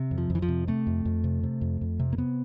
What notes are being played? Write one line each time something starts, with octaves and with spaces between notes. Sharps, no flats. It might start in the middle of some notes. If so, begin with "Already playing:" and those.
Already playing: C3
F2
F3
F2
E3
F3
C3
C3 A3
F2
F2
C3
C3
F2
F2
C3
A#3
C3 B3